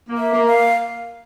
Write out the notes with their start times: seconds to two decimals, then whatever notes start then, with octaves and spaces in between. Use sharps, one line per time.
0.10 A#3
0.17 E5
0.32 A#3
0.46 F5